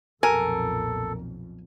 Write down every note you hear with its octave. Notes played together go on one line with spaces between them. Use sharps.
B1 F2 A#2 A4 A#4 G#5